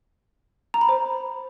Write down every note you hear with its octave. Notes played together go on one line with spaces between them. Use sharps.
A#5
B5
C5